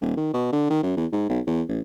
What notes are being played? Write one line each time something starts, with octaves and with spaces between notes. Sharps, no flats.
D#1
D#3
B2
D3
D#3
F#2
E2
G#2
B1
E2
A1